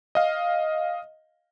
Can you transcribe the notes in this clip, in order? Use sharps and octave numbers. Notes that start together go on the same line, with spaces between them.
D#5 F5